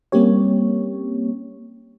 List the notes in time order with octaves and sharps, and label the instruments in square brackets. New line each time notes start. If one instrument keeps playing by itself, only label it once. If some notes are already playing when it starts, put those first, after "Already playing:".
[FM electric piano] G3 A#3 C4 C#4 G4 C#5